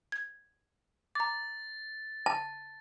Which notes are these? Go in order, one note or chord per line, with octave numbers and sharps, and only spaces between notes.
G#6
A#5 D6 A6
A5